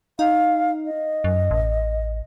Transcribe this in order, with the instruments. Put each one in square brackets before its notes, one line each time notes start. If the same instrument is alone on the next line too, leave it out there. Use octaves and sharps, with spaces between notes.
[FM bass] D#4 [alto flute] F5
[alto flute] D#5
[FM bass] F#2
A1